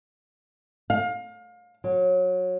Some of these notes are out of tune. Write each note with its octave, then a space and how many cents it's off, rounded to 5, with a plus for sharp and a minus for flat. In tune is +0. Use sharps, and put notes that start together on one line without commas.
F5 +30
F#3 -25